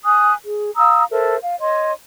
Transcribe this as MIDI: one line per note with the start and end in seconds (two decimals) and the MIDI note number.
0.04 0.33 80
0.04 0.33 87
0.04 0.33 90
0.44 0.69 68
0.75 1.03 77
0.75 1.03 82
0.75 1.03 87
0.75 1.03 88
1.11 1.35 69
1.11 1.35 70
1.11 1.35 72
1.11 1.35 76
1.41 1.54 77
1.59 1.91 73
1.59 1.91 75
1.59 1.91 84